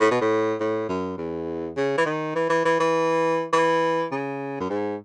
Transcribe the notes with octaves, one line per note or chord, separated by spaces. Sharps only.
A2
B2
A2
A2
F#2
E2
C#3
E3
D#3
E3
E3
E3
E3
E3
C#3
F#2
G#2